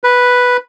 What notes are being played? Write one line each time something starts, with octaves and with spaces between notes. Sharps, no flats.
B4